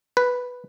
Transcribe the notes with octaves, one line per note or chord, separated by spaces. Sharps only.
B4